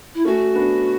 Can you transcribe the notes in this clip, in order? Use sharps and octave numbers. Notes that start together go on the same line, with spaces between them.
E4
A3 C#4 F#4
B3 D4